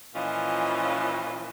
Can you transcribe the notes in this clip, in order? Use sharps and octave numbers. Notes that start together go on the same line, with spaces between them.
A#2 E3 F3 C#4 F4 D#5